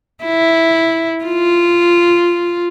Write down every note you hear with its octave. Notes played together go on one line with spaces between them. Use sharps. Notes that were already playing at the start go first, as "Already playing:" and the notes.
E4
F4